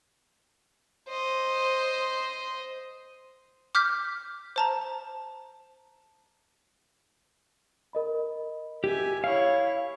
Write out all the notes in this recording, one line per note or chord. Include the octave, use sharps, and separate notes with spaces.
C5 D#5
D6 F6 G6 B6
C5 A5 A#5
A#4 D#5 B5
G4 E5 G#5
E4 C#5 F5